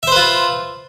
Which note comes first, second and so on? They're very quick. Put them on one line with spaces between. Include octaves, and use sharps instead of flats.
E5 C5 B4 F4